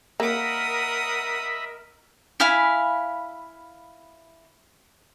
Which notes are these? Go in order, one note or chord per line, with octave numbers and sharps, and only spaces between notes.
A#3 A#4 D#5 E5 F#5 B5 D#6
E4 F5 G#5 B5